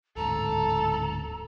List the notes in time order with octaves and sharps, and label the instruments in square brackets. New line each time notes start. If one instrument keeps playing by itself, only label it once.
[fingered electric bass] D1 G#2 [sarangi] A4 [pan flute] A#5